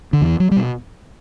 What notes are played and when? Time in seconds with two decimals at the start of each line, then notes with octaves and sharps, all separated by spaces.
0.13 D3
0.21 E2 E3
0.40 F#3
0.51 G3
0.56 B2